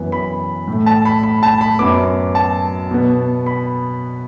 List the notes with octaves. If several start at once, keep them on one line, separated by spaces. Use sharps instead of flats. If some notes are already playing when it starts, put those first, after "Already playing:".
Already playing: F#2 E3 B3
B5
A2 A3
A5
B5
B5
A5
B5
F#2 F#3 B3 D6
A5
B2 B3
B5